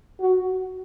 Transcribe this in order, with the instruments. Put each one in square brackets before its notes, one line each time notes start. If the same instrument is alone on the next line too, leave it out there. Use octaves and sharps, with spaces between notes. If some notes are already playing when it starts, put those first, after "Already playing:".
[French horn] F#4